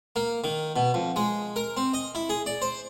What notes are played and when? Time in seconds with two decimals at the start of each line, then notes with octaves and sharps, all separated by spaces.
0.16 A#3
0.44 D#3
0.76 B2
0.94 F2
1.16 G#3
1.56 A#4
1.77 C4
1.93 D#5
2.15 E4
2.29 G#4
2.46 D5
2.62 C5